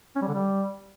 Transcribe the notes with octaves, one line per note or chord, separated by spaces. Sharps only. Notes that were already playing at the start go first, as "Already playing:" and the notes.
C#4
G3
D3
G3